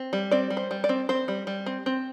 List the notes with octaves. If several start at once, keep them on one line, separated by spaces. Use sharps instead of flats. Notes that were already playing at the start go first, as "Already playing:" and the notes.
Already playing: C4
G3
C4 D5
G3
C5
G3
D5
C4
C4 C5
G3
G3
C4
C4